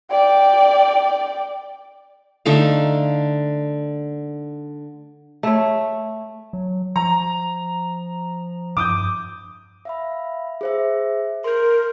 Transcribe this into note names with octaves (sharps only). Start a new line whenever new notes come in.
D5 G5
D3 A3 D#4 F5
A3 C#5
F#3
F3 A#5
G2 D6 D#6 G6
E5 F5 B5
G#4 C5 E5
A#4 C6 G6